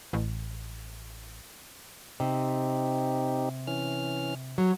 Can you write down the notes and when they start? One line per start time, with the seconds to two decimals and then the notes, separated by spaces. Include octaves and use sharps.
0.13 A1
2.20 C3 C4 D#4 G4
3.67 E3 C#4 F6
4.58 F#3 C#5